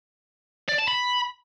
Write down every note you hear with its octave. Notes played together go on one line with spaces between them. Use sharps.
D5
A5
B5